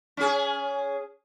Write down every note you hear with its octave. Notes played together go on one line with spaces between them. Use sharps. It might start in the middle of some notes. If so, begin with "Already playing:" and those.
C#4 G#4